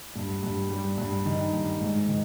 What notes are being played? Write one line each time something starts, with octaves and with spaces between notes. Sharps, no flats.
G2
G2
G3
G2
D#3
G2
G#2
D#3